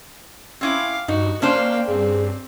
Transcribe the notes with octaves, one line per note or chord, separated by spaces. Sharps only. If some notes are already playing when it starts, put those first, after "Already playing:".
C4 C#4 E4 F5 D6
G2 D#4 F#4
A#3 C#4 D4 C5 F5 G5
G2 C4 G#4